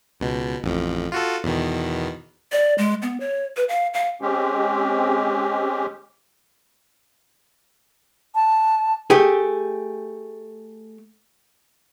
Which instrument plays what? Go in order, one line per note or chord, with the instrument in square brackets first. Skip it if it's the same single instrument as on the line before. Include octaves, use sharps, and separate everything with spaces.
[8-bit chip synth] C#2 B2
A1 F2
F4 F#4 A4
E2 B2 D#3
[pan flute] D5
G#3
B3
C#5
B4
F5
F5
[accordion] G#3 C4 C#4 G4
[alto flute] A5
[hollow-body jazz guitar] A3 G4 G#4